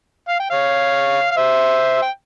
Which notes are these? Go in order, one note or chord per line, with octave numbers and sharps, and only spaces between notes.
F5
G5
C#5 F5
F5
C5 E5
G5